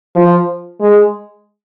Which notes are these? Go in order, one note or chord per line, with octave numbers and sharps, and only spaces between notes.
F3
G#3